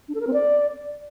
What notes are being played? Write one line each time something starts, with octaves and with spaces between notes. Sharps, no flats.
D4
A4
A#4
C4
D5